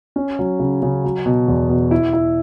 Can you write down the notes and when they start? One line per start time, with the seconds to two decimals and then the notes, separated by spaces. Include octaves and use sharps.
0.16 C#4
0.39 F#3
0.60 C#3
0.83 C#3
1.05 F#3
1.26 B2
1.48 E2
1.69 B2
1.91 E4
2.13 E4